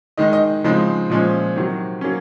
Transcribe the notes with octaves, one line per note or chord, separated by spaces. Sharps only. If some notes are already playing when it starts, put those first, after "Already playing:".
D#3 G#3 D#4 D#5
D#5
C#3 F3 G#3 C4 D#4
A#2 F3 G#3 C#4
C3 D#3 F#3
F#3 A#3 C#4